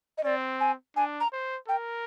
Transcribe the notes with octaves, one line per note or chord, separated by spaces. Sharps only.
D#5
C4 D5
G#5
D4 G#5
A#5
C5
A#4 G5